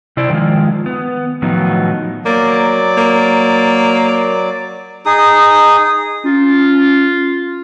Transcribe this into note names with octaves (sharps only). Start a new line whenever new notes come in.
C3 E4 C5 D5
D#3 F3 F#3 G#3 F4
B3
A2 D#3 F3 F#3 B3 D#4
F#3 A#3 D5 D6
A#3
D#4 G#4 D#6
C#4 F4